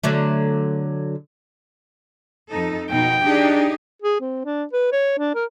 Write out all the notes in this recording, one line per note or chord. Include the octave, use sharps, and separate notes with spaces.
D3 F#3 A3
F2 D#4 A4
B2 D#4 G5
D4 D#4 G4 G#4
G#4
C4
D4
B4
C#5
D4
A#4